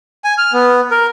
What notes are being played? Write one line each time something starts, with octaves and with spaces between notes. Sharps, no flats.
G#5
F6
B3
A#4